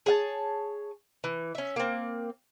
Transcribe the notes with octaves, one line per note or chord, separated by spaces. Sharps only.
G#4 C#5 F#5 A5
E3
C#4 E5
A#3 C4